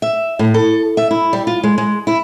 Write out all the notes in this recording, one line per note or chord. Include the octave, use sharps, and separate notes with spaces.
E5
A2
A4
E5
E4
G3
F4
G#3
G#3
E4